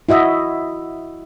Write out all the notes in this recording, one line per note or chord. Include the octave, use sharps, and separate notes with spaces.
E4 F#4 D#5 E5